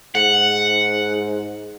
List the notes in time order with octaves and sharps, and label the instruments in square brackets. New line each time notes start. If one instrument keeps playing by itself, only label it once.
[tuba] G#2 [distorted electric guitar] F#5